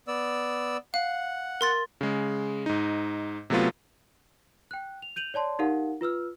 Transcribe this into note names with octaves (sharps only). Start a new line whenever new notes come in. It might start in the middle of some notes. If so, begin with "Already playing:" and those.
B3 D5 E6
F5 F#5
A#4 C6 A6
C#3 G#3
G#2 D#4
C3 F#3 A3 B3 F4
G5 F#6
F7
G6 D#7 F7 F#7
C#5 D5 A5 C6
D#4 G4 A#4 F5 F#5
F4 B4 E6 F6